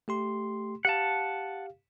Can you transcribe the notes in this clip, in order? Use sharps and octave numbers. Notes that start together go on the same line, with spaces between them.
A3 G4 C6
G4 F5 F#5 A5